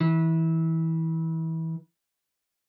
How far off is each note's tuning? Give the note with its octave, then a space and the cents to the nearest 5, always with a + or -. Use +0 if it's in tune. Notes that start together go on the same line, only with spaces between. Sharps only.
E3 -25